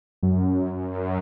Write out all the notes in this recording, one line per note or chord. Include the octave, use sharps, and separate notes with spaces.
F#2